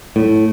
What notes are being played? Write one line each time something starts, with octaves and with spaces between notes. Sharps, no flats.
A2